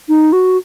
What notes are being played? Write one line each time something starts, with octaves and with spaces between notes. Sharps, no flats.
D#4
F#4